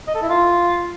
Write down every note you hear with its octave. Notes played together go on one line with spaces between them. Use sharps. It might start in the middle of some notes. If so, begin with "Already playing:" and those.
D#5
A4
E4
F4